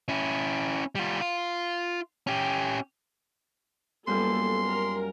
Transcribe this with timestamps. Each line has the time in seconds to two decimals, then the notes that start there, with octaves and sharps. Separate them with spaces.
0.09 C#4 E4
0.95 G3 F4
1.21 F4
2.27 C#4 G4
4.07 F#2 G3 A#3 B3 F4 A4 C6
4.67 A#4